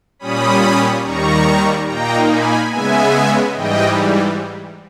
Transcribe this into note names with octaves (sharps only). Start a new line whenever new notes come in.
A#2 G3 C#4 B5 D#6
D#2 D#3 G3 A#5 C#6
A#2 A#3 D#4 G5 A#5
G#5 B5
C#3 G#3 B3 E5 G#5
G#2 E3 G3 D#5 G5